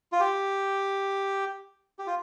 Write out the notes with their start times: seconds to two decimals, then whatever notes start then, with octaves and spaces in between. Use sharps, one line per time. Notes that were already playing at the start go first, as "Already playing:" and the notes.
0.12 F4
0.20 G4
1.99 G4
2.07 F4